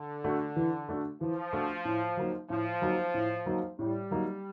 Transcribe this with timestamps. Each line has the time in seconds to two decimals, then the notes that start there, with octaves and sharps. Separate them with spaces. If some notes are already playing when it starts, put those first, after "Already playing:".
Already playing: D3
0.24 A3 D4 F#4
0.56 E3
0.89 A3 D4 F#4
1.21 E3 F3
1.53 A3 D4 F#4
1.85 A2
2.17 F#3 A#3 D#4
2.50 A2 F3
2.82 F#3 A#3 D#4
3.14 A2
3.46 F#3 A#3 D#4
3.79 A2 G3
4.11 F#3 A#3 D#4